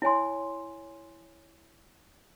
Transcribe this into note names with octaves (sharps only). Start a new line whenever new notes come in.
E4 C#5 G#5 C6